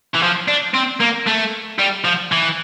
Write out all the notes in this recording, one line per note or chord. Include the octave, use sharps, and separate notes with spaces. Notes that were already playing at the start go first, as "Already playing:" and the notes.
E3
F3
D4
C4
A#3
A3
G3
F3
E3